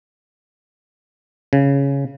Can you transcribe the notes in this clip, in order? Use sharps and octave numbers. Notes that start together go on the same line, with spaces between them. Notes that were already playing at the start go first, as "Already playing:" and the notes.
C#3